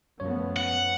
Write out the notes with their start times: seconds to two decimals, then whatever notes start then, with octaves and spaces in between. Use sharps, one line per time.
0.20 F#2 F3 A3 B3 C#5
0.57 F#5